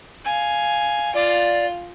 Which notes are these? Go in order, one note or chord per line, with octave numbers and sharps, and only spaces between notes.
F5 G#5
F4 D5 F5